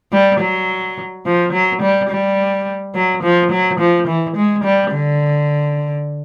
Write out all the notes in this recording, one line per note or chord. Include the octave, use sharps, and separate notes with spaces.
G3
F#3
F3
F#3
G3
G3
F#3
F3
F#3
F3
E3
G#3
G3
D3